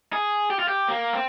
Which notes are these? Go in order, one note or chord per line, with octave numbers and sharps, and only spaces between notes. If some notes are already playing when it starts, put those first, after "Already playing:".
G#4
G4
F4
G4
A#3
C4